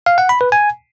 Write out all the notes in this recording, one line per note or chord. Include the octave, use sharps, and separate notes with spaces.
F5
F#5
B5
B4
G#5